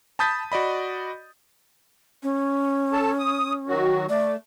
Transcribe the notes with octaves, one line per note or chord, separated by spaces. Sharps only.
A5 B5 D#6 G6 A6 B6
F#4 D5 D#5 B5
C#4
A4 A5
D#6
D#3 F#3 F#4
A3 D5